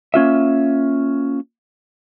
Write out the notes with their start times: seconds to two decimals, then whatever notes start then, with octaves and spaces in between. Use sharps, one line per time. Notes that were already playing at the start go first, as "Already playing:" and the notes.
0.14 A#3 C#4 F4 E5